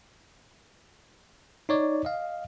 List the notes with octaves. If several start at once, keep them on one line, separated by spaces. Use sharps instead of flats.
D#4 C#5 D5
D#5 F5